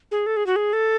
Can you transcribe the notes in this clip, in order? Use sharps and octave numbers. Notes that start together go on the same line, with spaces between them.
G#4
A4
G#4
F#4
G#4
A4